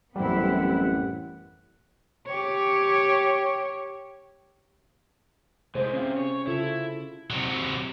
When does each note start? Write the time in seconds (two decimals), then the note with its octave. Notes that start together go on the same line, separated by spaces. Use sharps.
0.16 A1 F#2 G3 B3 C4 E4 F#5
2.26 G4 C#5
5.75 A2 C3 G#3 G#4 C5
5.94 C3 C#4 F5
6.17 C#5
6.47 C#3 E4 F4 A4
7.30 C3 F#3